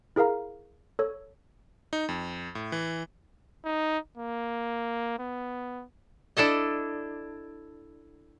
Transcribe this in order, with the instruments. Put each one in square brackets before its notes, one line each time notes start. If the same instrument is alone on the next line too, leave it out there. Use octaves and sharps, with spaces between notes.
[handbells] E4 G#4 A#4 F5 A#5
A4 C#5
[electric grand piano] D#4
F2
A2
E3
[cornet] D#4
A#3
B3
[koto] D4 E4 A4 D#5